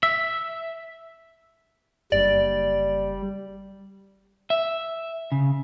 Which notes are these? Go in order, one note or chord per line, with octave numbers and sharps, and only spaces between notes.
E5
F#1 G3 D4 D5
E5
C#3